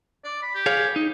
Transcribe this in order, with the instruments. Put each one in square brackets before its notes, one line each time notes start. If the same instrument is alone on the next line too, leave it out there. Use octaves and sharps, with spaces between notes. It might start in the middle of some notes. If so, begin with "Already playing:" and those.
[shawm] D5
B5
G4
[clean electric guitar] G#4 C#5 F5
D#4